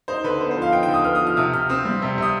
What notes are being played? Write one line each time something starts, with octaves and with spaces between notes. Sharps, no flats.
D#4 C5
D3 B4
B3 C5
C5
F3
F5
D#4 G5
G5
D3
D#6
B3 F6
D#6
F3
F6
C3 D#6
C3 F6
C4 D#6
G3
C3
C3 D#6